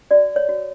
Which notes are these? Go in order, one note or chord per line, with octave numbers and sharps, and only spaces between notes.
F#4 D5
C#5
F#4